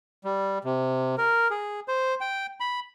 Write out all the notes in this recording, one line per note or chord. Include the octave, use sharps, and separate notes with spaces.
G3
C3
A#4
G#4
C5
G5
B5